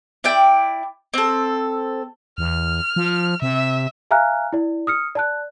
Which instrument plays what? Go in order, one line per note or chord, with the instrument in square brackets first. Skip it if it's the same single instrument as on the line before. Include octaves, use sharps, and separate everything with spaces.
[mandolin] E4 D5 G5
C4 A4
[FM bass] E2 [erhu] F6
[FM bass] F3
[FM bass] C3 [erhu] E5
[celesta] E5 F5 G#5 A#5 F6 F#6
E4 D5
D#6 F6 C#7
D5 A5 F#6